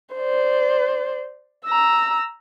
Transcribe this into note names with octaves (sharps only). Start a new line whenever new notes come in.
C5 D5
A#5 E6